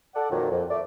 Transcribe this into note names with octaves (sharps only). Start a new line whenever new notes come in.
A4 D5 F#5
F2 A#2 D#3 F#3
F2
A3 D5